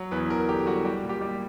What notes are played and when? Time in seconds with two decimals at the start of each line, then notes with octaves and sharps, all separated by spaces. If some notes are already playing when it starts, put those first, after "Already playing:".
Already playing: F#3
0.11 E2 B4
0.30 E2 A#4
0.48 D3 G4
0.66 G3 F#4
0.85 G3 G4
1.03 A#2
1.09 G4
1.21 G3